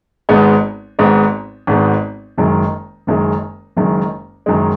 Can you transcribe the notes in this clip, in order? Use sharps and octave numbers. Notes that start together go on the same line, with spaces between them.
G#1 G#2 G#3 B3
G#1 G#2 G#3 B3
G#1 G#2 G#3 B3
F#1 F#2 D#3 G#3
F#1 F#2 D#3 G#3
F#1 F#2 D#3 G#3
F#1 F#2 D#3 G#3